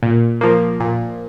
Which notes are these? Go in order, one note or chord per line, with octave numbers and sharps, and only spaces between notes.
A#2
F3 A#3
A#2